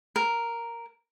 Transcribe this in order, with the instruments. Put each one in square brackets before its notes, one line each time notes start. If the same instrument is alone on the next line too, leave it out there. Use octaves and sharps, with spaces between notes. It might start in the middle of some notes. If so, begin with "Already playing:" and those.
[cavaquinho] A#4